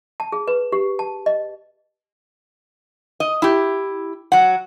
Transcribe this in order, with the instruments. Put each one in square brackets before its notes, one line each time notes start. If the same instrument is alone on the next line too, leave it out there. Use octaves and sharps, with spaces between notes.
[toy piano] A5
G#4
B4
G4
A5
D#5
[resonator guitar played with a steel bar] D#5
E4 G4
F#3 F#5